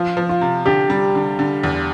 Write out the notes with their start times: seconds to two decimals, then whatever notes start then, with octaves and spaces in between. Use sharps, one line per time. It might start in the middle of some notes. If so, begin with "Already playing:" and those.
Already playing: F3 F4
0.17 F3
0.29 F4
0.41 C3
0.66 D3 G4
0.90 G3
1.15 D3
1.39 D3
1.63 E2